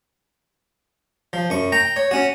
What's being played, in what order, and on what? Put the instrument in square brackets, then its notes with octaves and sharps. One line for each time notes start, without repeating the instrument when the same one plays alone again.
[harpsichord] F3
F#2 C#6
G5 A#5
C#5
C#4 F#4